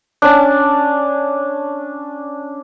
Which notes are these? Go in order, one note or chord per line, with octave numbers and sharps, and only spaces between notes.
C#4 D4